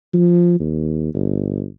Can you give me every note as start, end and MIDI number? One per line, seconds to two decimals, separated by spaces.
0.13 0.59 53
0.60 1.13 39
1.14 1.65 31